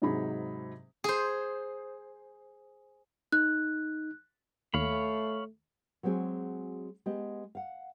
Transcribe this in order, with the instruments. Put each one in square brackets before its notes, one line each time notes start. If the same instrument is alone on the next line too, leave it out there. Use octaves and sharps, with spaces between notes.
[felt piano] G#2 C3 F#3 D#4 G#4 B5
[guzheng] G#4 C5
[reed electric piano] D#4 [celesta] F#6
[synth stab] D#2 [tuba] A3 [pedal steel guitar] C#5 F5 B5
[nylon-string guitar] F#3 G#3 B3 C4 F#4 G#4
G#3 B3 G4 D#5
F5 F#5